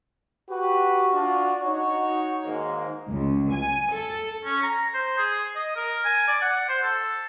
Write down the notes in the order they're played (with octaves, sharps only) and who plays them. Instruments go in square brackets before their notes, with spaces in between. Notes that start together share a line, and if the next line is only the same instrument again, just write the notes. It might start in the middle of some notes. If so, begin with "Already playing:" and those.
[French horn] F#4 [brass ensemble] G4 B4
[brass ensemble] D4 F4
D#4 C#5
[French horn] G#2 [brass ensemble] D#3 G#3 A#3
[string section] C#2
G#5
A4
[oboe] C#4
A#5
C5
G#4
D#5
A#4
G#5
D5
F#5
C5
A4